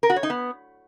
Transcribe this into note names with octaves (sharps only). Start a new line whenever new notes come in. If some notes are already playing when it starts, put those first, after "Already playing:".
A#4
F#4
C#5
D#4
B3